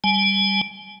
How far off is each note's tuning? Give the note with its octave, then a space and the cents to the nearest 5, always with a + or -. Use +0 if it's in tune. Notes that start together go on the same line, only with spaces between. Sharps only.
G3 +0 G#5 +25